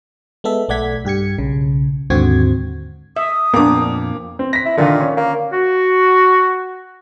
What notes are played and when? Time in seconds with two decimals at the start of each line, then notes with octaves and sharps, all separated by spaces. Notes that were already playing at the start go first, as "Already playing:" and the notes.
0.44 G#3 B3 A4 E5
0.69 B1 A3 D5 F#5 G#6 B6
1.05 G2 G4 G#6 C#7
1.38 B1 C#3
2.10 D#2 G#2 D3 C4 F#4 G#6
3.16 E5 D#6
3.54 F2 A#2 A#3 B3 D4 D6
4.39 C4
4.53 A#6 B6
4.66 E4
4.77 A#2 D3 D#3 F4
5.00 C#4
5.17 A#3
5.52 F#4